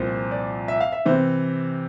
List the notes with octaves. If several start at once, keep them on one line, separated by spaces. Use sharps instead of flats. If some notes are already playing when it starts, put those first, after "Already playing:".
Already playing: C2 A#2 F3 C4 C5
D5
E5
F5
E5
C3 E3 C5